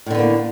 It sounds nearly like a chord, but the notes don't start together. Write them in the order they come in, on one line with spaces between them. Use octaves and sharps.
A2 D3 B3 A#3